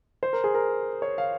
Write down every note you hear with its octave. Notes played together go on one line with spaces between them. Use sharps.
C5
A#4
G#4
A#4
C#5
F5